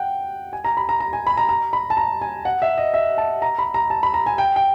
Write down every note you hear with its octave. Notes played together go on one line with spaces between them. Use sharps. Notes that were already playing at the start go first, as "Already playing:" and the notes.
Already playing: F#5 G5
G#5
A#5
B5
A#5
A#5
G#5
B5
A#5
A#5
B5
A5
A#5
G#5
F#5
E5
D#5
E5
A5
A#5
B5
A#5
A5
B5
A#5
G#5
G5
G5